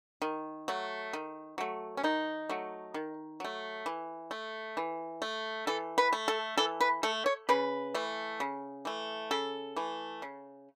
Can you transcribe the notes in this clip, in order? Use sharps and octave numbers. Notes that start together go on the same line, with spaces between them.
D#3
F#3 A3
D#3
F#3 A3
C#4
D#3 D#4
F#3 A3
D#3
F#3 A3
E3
A3
E3
A3
E3 A4
B4
A3
A4
E3 A4
B4
A3 A4
C#5
C#3 B4
E3 A3
C#3
E3 A3
C#3 A4
E3 A3
C#3